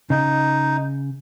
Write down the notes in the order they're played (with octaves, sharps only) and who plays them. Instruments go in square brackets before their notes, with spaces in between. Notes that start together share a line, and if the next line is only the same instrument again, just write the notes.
[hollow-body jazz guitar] C#3 [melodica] D#4